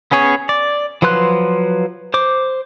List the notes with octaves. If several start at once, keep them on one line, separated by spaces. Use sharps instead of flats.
B3 C#4 G#4 C#5
D5
F3 F#3 B4 C6 F#6
C5 D6